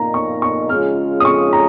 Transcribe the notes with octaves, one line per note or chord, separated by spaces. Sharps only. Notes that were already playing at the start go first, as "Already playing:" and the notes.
Already playing: A#2 A#3 D#4 A#5
C#6
C#6
C#3 G#3 C#4 F4 F6
D#6
C#6
A#5